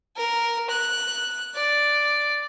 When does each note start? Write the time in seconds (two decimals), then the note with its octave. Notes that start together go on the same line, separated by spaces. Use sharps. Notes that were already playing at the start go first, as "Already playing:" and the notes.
0.16 A#4
0.70 F#6
1.55 D5